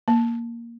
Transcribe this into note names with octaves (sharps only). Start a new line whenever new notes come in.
A#3